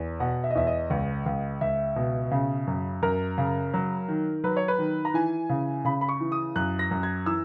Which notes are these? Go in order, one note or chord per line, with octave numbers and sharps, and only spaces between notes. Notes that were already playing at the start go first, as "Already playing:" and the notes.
Already playing: E2
B2 F#5
E5
D#5
E2 E5
D#5
C#2
C#2
C#2 E5
B2
C#3
F#2
F#2 A#4
C#3
F#3
D#3
F#3 B4
C#5
B4
D#3
A#5
E3 G#5
C#3
C#3 B5
B5
C#6
E3
D#6
F#2 F#6
A#6
F#2
G#6
E3 E6